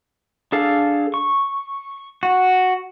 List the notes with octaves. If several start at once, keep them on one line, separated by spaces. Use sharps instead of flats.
D4 G#4 A4 F5
C#6
F#4